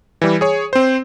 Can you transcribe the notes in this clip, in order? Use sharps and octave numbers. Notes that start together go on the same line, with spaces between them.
E3 G3
G#4 C#5
C4 C5